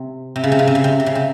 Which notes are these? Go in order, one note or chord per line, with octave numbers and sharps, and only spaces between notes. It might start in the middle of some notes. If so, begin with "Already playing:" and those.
Already playing: C3
C3
C#3
C3
C#3
C3
C#3
C3
C3
C#3
C3